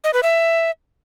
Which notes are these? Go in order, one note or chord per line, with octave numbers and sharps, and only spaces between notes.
D#5
B4
E5